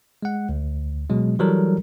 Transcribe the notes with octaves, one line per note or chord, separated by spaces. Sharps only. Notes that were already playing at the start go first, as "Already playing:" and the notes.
G#3 F#5
D2
B2 F#3 G#3
E3 F#3 G3 A4 A#4